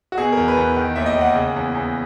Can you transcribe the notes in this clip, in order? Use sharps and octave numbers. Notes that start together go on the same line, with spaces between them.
F#4
B2 G#4
E2 A#4
B4
E2
D#3
D#2 E5
D#5
D#2 F#5
C#3
E2
E2